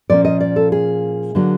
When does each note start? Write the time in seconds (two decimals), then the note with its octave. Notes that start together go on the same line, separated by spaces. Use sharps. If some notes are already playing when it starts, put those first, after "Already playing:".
0.10 A#2 F3 A#3 C#4 D5
0.25 D#5
0.40 D5
0.56 A4
0.72 G#4
1.35 D3 F#3 A#3